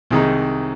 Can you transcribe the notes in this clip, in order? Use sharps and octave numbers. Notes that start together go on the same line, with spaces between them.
C2 C3 D#3 G#3 D#4